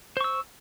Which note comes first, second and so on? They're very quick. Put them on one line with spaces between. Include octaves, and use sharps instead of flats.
C5 C#6 E6